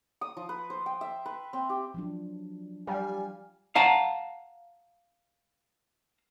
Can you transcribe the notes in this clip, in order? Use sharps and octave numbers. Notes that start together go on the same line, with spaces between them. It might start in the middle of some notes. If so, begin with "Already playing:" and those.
D#6
F3
B4
C5
G5
E5
B4
C4
G4
F3 F#3 D4
G3 F5 G#5
F5 F#5 A5 A#5